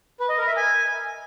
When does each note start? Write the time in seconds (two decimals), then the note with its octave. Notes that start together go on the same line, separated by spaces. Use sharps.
0.20 B4
0.29 D#5
0.38 A#4
0.47 E5
0.56 G#5